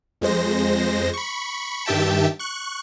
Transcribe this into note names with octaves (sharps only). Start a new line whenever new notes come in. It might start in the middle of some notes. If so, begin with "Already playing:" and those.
F2 G#3 C5 A#6
B5 C#6
G2 D#3 G4 E5 G5 A5
C#6 F#6